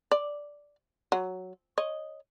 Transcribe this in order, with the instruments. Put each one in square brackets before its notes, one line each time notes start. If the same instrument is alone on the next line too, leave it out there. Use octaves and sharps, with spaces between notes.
[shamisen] D5
F#3
C#5 D#5